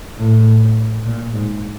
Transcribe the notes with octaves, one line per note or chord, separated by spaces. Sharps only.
A2
A#2
G#2